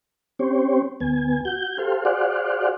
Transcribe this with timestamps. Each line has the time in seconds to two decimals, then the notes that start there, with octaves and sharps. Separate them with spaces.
0.39 C4 C#4 G4 C5 C#5
1.00 D2 B3 G#5
1.45 F#4 G6
1.78 G4 A4 C5 F5
2.05 F#4 G#4 C5 D5 F5 F#5